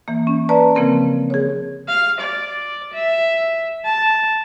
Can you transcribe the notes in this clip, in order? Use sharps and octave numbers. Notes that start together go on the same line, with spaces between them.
E3 A#3
C#4
B4 D5 A5 A#5
C#3 F3 A#3 C4 A#4
G#4 C#5
F5
D5
E5
A5